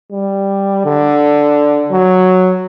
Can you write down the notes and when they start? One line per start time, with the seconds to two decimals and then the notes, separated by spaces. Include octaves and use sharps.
0.12 G3
0.85 D3
1.91 F#3